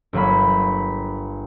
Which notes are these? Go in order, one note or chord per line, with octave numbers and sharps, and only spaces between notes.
G1 F#3 A#3 B5